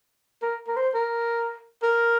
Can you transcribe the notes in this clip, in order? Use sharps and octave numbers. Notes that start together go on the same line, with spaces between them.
A#4
A#4
C5
A#4
A#4